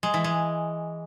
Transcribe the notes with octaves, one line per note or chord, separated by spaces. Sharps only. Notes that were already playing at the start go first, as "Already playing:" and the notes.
G#3
E3
G#3